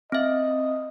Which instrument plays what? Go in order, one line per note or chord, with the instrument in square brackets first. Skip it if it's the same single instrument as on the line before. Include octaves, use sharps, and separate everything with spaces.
[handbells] C4 E5 [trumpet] D#5